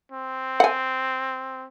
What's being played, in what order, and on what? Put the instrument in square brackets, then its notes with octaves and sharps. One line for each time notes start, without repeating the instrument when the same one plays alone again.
[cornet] C4
[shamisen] F#5 G#5